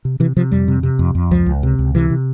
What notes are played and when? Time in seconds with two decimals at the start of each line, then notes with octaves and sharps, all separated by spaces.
0.05 C3
0.20 C3 E3
0.36 C3 F3
0.52 F2 G3
0.68 C3
0.83 C3
0.99 F2
1.15 F2
1.31 C#2 F3
1.46 C#2
1.63 C3
1.79 C#2
1.95 C3 E3
2.10 C3